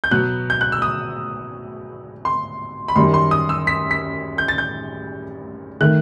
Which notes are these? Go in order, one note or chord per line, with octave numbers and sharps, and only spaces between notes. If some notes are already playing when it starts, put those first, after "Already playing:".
G6
B2 F#3 B3 F#6
G6
F#6
E6
D#6
C6
B5
F#2 D#3 G3 C6
C6
D#6
E6
B6
B6
G6
A6
G6
D#3 A3 F#6